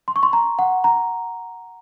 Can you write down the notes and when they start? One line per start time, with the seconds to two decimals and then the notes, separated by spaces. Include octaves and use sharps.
0.08 C6
0.16 C#6
0.23 C6
0.33 A#5
0.59 F#5
0.84 A#5